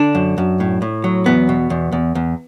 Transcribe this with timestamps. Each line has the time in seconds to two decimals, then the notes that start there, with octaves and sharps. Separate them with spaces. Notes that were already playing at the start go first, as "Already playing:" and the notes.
Already playing: D3 D4
0.15 F#2
0.38 F#2
0.60 A2
0.82 A2
1.04 F#3
1.26 E2 B3
1.49 B2
1.70 E2
1.92 E2
2.15 E2